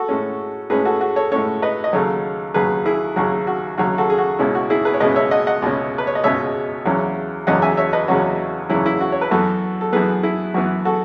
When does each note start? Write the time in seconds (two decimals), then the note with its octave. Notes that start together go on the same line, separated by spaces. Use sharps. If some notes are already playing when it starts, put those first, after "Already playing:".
Already playing: F#4 A4
0.09 A2 G#3 C#4
0.70 A2 G#3 C#4 G#4 B4
0.85 F#4 A4
1.01 F#4
1.16 A4 C#5
1.32 A2 G#3 C#4 A4 C#5
1.62 B4 D#5
1.84 D#5
1.93 D#2 C#3 F#3 A4 C#5
2.54 D#2 C#3 F#3 G#4 B4
2.85 E4 G#4
3.16 D#2 C#3 F#3 F#4
3.47 F#4
3.78 D#2 C#3 F#3 F#4
3.98 F#4 A4
4.10 G#4
4.18 F#4
4.39 C#2 B2 G#3 C#4 E4
4.55 F#4
4.70 E4 G#4
4.85 G#4 B4
4.94 C#5
5.00 C#2 B2 G#3 C#4 B4 D#5
5.16 C#5 E5
5.31 D#5 F#5
5.47 D#5 F#5
5.62 C#2 B2 G#3 C#4
5.98 B4
6.07 C#5
6.15 D#5
6.24 C#2 B2 G#3 C#4 C#5 E5
6.86 E2 C#3 F#3 C#4
7.47 E2 C#3 F#3 C#4 D#5 F#5
7.62 E5 G#5
7.77 C#5 E5
7.93 B4 D#5
8.08 E2 C#3 F#3 C#4 F#4
8.70 E2 C#3 F#3 C#4 E4
8.86 E4
9.00 F#4
9.12 C#5
9.21 B4
9.31 F#2 E3 B3 F#4 A4
9.81 A4
9.92 F#2 E3 B3 G#4 B4
10.23 E4 G#4
10.54 F#2 E3 B3 F#4
10.85 F#4 A4